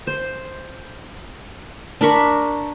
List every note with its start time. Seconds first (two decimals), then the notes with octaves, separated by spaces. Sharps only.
0.07 C5
2.01 D4 A#4 B5 C#6